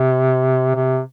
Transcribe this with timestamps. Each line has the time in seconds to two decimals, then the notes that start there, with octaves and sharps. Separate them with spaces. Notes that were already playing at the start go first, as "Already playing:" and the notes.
Already playing: C3
0.75 C3